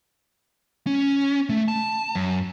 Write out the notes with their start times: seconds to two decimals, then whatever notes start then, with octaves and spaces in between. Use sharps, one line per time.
0.87 C#4
1.49 A3
1.68 A5
2.15 F#2